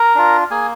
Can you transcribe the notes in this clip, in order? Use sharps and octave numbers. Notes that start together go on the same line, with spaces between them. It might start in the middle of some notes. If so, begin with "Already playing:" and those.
Already playing: A#4 A#5
D4 F4
A#3 G#4 G#5